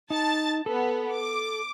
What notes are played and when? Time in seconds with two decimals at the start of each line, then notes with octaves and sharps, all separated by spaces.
0.10 D#4 A5 A6
0.66 B3 A4
1.13 D6